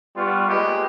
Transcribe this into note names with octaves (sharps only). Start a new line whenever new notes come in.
G3 B3 F4 C6 C#6
G#3 A#3 G4 B4 D#5